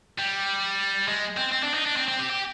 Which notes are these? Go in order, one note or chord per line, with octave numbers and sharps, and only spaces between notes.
G3
G#3
C4
C4
D4
D#4
D4
C4
C4
G4
G4